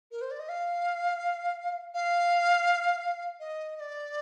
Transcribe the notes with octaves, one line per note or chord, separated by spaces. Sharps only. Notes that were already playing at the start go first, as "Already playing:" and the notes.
A#4
C5
D5
D#5
F5
F5
D#5
D#5
D5